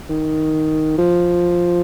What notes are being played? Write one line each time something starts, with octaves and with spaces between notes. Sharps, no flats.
D#3
F3